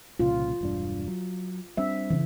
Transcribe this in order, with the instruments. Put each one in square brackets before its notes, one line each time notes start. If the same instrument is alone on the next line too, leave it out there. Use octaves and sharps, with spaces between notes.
[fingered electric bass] C2 A#2 C#3 [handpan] F4
[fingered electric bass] E1 G2 D4
F#3
[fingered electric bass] G3 C4 D4 [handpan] E5
[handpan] C#3 E3